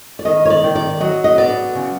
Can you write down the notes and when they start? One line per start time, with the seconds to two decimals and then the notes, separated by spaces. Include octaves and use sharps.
0.19 D5
0.25 D#3 D#5
0.45 C#5
0.50 D5
0.64 D#3
0.75 D5
1.00 F#3 D#5
1.24 D#5
1.38 B3 D5
1.75 C#3